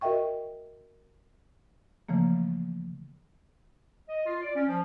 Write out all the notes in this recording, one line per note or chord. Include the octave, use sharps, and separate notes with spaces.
F#4 A#4 D#5 E5 G5 C#6
C#3 E3 F3 A3 A#3
D#5
F4
D5
C#4
F3